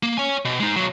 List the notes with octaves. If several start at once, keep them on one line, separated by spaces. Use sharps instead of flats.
A#3
C#5 G#5
B2
G#3 D#4
B1 F#3